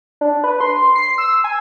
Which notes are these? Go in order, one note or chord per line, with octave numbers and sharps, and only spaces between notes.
D4
B4
C6
C7
E6
G#5